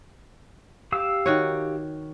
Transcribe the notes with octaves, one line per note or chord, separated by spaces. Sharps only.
G4 F5 E6
D#3 F#4 C#5